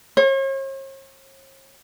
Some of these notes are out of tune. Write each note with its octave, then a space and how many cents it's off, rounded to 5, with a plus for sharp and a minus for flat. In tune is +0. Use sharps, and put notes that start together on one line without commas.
C#5 -45